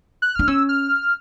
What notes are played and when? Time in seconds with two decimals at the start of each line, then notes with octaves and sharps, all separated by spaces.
0.22 F#6
0.35 D4 F6
0.48 C#4 E6
0.69 F6